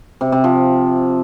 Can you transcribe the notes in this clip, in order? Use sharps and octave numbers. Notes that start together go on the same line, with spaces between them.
C3
C3
F3